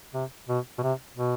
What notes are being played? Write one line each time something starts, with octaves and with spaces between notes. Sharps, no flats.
C3
B2
B2
C3
B2